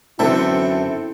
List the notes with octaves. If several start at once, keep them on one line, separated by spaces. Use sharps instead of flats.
F#2 D3 E3 C4 E4 A4 E5